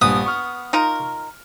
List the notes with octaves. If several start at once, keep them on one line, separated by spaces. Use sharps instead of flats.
A#1 G2 B3 G#5 D#6
C#6 F6
D#4 F4 A#4